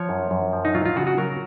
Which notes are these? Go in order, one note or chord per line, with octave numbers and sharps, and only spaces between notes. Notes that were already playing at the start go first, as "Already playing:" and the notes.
Already playing: F3 C#5
F#2
F#2
F3
D#4
F#3 F4
F4
C#3 F#4
F#4
F#3 A#4